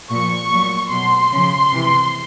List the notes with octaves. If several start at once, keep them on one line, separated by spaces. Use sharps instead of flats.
A#2 F3 C#6
A#2 F#3
B2 F#3 C6
C#3 F3
C3 E3